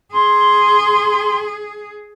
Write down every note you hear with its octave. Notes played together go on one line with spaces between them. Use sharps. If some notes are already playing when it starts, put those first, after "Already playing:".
G#4 C6